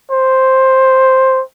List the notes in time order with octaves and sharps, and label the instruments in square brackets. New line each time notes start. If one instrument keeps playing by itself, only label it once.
[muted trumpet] C5